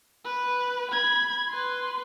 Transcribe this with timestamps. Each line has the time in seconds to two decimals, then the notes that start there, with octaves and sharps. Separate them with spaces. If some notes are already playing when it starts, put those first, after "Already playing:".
0.25 B4
0.91 B5 G#6
1.49 B4 C6